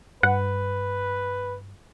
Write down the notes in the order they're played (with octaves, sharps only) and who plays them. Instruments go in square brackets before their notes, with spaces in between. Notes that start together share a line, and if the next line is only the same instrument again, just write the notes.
[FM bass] G2 [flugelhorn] B4 [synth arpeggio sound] F#5